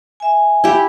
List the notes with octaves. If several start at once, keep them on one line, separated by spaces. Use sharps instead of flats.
E5 G#5
E4 G4